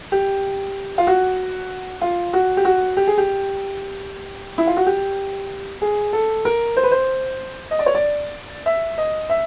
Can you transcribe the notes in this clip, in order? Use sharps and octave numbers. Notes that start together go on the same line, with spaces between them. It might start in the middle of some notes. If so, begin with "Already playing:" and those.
G4
F4
F#4
F4
F#4
G4
F#4
G4
G#4
G4
E4
F4
F#4
G4
G#4
A4
A#4
C5
B4
C5
D#5
D5
C#5
D5
E5
D#5
E5